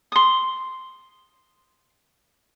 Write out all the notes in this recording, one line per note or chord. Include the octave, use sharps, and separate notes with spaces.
C6 D#6